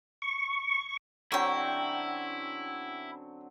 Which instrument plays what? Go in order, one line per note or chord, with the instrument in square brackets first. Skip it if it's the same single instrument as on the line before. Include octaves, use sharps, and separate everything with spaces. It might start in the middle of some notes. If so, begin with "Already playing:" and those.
[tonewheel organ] C#6
[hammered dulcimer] D3 F#3 C4 [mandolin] C#4 G5 [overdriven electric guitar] E4